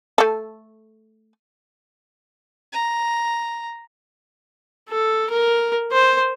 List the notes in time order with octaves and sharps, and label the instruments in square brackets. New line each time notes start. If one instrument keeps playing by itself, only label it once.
[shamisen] A3 A4
[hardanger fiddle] A#5
[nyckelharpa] A4
A#4
C5